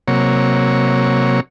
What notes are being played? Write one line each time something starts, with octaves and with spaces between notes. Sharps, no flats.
C3 F#3 A#3 C#5